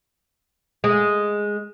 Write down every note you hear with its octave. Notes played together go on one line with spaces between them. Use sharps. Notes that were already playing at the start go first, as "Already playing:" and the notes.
G#3